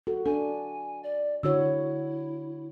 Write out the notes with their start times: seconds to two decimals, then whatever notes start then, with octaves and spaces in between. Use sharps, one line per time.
0.07 F#4 A4
0.26 D4 A4 G#5
1.03 D5
1.43 D3 E4 F#4 C#5 E6